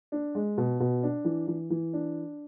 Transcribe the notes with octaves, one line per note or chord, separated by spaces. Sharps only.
D4
G#3
B2
B2
D4
E3
E3
E3
D4